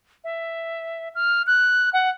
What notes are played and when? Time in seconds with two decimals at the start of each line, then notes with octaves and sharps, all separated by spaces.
0.24 E5
1.15 F6
1.47 F#6
1.93 F#5